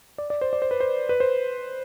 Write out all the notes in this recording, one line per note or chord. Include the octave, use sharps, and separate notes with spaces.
D5
D5
C5
D5
C5
B4
C5
B4
C5